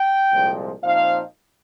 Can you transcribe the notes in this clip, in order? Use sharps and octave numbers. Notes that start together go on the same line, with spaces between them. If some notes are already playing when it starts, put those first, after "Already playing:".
Already playing: G5
C2 A#2 F3 G#3
A#2 F3 C4 D#4 F5